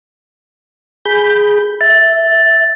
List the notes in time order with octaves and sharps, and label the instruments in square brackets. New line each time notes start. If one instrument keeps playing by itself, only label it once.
[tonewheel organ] G#4 B5 G6
[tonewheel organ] E5 [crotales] A6